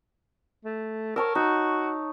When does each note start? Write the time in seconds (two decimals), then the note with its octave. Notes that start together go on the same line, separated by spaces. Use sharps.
0.65 A3
1.16 A#4 C#5 A5 E6
1.35 D#4 F#4